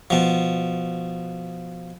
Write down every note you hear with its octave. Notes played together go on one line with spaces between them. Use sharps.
B2 F3